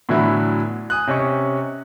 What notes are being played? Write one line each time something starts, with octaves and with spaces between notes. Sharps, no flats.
A2 D3 E3 F#3 B3 E4
G#5 D#6 F#6
C3 C#4 D#5 C#6